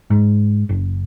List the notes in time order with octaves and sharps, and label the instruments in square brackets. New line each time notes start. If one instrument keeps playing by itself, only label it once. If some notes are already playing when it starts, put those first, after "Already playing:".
[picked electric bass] G#2
F#1